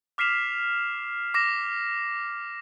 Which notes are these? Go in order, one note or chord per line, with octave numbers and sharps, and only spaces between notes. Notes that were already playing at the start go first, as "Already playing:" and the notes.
D6 F6 B6 C7 E7 F7
D6 A#6 E7